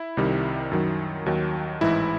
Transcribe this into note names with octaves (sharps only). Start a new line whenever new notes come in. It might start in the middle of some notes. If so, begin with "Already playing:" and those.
Already playing: E4
C2 C3 D#3 G3
F#2 D#3 F#3
D#2 D#3 F#3
A1 G#2 E3 E4